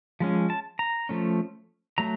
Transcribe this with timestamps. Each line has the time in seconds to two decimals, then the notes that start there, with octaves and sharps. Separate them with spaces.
0.20 F3 G#3 C#4
0.50 A5
0.79 A#5
1.09 F3 A3 C#4
1.98 F#3 A3 A#5